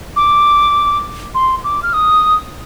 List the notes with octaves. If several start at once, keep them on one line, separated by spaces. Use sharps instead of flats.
D6
C6
D6
F6
D#6